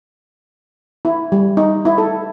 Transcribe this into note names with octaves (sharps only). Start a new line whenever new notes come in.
E4
G3
D#4
E4
A4